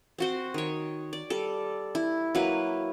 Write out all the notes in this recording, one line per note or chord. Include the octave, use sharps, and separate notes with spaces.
C4 F#4 C5
D#3 C#5
D5
G3 A4
E4
F#3 A#3 E4 B4